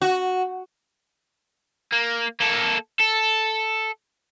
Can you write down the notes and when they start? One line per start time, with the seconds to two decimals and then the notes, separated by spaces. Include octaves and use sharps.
0.02 F#4
1.92 A#3
2.40 A#3 A4
3.00 A4